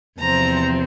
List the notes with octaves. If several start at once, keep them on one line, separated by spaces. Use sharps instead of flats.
E2 C3 F3 C4 A#5